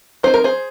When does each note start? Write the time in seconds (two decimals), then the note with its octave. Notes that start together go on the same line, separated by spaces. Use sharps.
0.23 F#3 C4 D#4 C5
0.34 A#4
0.44 G#4 C5